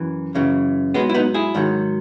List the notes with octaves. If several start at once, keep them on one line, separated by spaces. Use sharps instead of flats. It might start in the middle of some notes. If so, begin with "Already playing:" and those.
Already playing: F#2 E3
F#2 C#3 E3
G#2 F#3 G#3 B3
E4
B3 D#4
E4 G#4
G#2 D#3 F#3